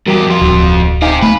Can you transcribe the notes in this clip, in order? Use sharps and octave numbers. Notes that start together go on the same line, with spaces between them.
E2 G3 F#4 G4 A#4
F2 F4
D1 F#4
C4 D#4 G4 F5 G#5
A3 B4